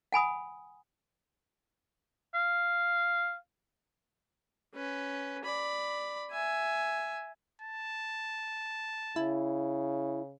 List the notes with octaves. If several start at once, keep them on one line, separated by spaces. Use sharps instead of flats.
F#5 G#5 B5 D#6
F5
C#4 B4
D5 B5
E5 G#5
A5
C#3 E4